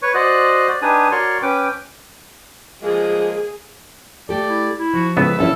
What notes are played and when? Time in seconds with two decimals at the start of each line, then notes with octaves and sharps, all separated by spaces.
0.02 B4 C#5 C#6
0.14 F#4 C5 D5 D#5 F#6
0.68 D5
0.82 D4 D#4 G4 B4 G#5 D#6
1.11 F#4 A#4 C#5 D5 C6 C#6
1.42 C#4 B4 G5 D6
2.82 F3 G#3 A#3 G#4
4.29 A3 G4 A4 D5
4.49 E4
4.79 E4
4.94 F3 F#4
5.17 C#2 A2 B3 B4 E6
5.39 A#1 E3 C#4 E4 A4